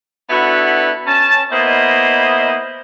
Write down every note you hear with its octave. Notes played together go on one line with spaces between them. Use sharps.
B3 D4 E4 F#4 A4 B4
C#4 A5
A#3 B3 E4 C5 D#5